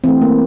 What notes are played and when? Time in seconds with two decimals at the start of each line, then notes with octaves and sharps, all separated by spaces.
0.04 E3 A3 C4
0.22 A#3